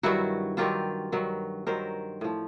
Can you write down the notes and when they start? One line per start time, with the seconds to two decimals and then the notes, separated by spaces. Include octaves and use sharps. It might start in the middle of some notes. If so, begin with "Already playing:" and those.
0.03 G2 D#3 F#3 E4 F#4
0.57 G2 D#3 F#3 F4 G4
1.12 G2 D#3 F#3
1.67 G2 D#3 F#3 A#4 C5
2.21 A2 F3